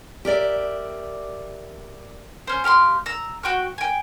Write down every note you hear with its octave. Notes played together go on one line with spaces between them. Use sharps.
G4 A#4 D5 E5
C#4 C5
G4 F5 B5 C6
A#5 E6
F#4 G5 C#6 F#6
G5 G#5